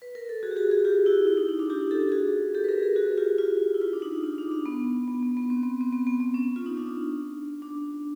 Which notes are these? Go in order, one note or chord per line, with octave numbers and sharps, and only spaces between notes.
B4
A#4
A4
F#4 G#4
G4
F#4 G#4
F#4 G#4
F4 G4
E4 F#4
E4
D#4
D#4
D4
F4 G4
G4 A4
F#4 G#4
G4 A4
B4
G#4 A#4
G#4 A#4
F#4 G#4
F#4
F4 G4
F4
E4
F4
D4
D#4
D#4
D4
D4
B3
B3
B3
B3
C4
B3
C4
B3
B3
B3
C#4
F4
D#4
D4
D4